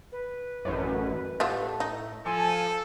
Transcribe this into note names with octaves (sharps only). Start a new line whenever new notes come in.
B4
A1 F#2
A2 G3 A3 B3 F4
D#4
F3 A4 G#5